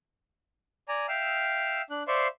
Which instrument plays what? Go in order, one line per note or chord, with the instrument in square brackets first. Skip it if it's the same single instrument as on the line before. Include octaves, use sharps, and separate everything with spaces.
[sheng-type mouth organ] D5 G#5 A#5
E5 F5 G5 E6 F6
D4 F#6
C5 D5 E5 F5 C6 C#6